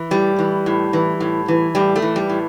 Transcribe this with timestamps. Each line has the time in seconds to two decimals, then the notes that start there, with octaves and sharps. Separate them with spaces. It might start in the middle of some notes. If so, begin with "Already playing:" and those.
Already playing: E3
0.11 A2 G3
0.39 E3
0.66 A2
0.93 E3
1.20 A2
1.48 E3
1.75 A2 G3
1.96 A3
2.02 E3
2.16 G3
2.29 A2